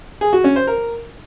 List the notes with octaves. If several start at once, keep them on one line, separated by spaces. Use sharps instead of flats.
G#4
F#4
C#4
C5
A#4